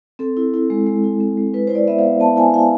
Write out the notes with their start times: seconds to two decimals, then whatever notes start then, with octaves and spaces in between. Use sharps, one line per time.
0.19 C4 A4
0.37 E4
0.54 E4
0.70 G#3
0.87 G#3
1.04 E4
1.20 C4
1.37 G#3
1.53 E4 B4
1.67 E4 C5
1.75 D5
1.88 B3 E5
1.99 F5
2.04 B3
2.20 B3 A5
2.37 E4 G#5
2.54 E4 F5